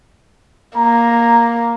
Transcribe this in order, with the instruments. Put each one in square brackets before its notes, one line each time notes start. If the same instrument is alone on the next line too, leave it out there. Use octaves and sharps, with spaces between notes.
[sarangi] A#3 [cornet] A#5